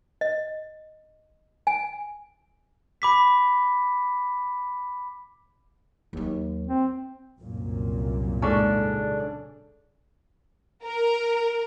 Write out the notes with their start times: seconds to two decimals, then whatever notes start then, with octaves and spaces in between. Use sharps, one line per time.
0.21 D#5
1.67 G#5
3.02 B5 D6 B6
6.13 D#2 F#3
6.67 C4
7.42 C2 F#2 A#2
8.42 G#2 C#3 C#4 D4 A4 D5 G#5 C#6
10.85 A#4